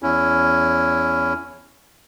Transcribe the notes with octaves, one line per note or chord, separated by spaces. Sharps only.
E2 C#4 E4